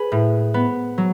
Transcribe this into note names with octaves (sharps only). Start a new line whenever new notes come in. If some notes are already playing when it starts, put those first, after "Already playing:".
Already playing: G#4 B4
A2
B3
F#3